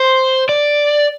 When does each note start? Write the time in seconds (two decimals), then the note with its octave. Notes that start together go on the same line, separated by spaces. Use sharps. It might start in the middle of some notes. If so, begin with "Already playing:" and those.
Already playing: C5
0.49 D5